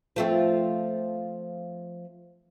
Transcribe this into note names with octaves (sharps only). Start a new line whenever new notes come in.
F3 A3 C4